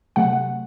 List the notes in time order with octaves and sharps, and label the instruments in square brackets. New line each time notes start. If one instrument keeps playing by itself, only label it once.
[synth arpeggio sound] C3 F#3 A3 F#5